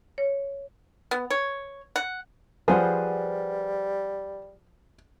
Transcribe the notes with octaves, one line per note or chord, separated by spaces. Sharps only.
C#5
B3
C#5
F#5
F3 G3 G#4 B4 C5 F#5